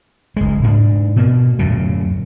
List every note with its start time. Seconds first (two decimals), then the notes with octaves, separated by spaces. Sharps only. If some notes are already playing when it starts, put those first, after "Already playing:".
0.36 F#1 G#3
0.63 G#2 D4
1.16 B2 A#3
1.59 D1 F#2 A#2 C#3